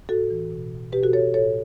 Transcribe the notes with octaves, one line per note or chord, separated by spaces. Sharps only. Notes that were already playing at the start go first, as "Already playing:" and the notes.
A2 F#4 A4
E3
B2
B2 G4 B4
F#4 A4
A4 C#5
A2 A4 C#5